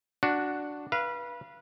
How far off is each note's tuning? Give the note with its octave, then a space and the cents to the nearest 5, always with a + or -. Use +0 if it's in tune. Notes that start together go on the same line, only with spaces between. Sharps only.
D4 +0 F#4 +0
B4 -25 F5 -30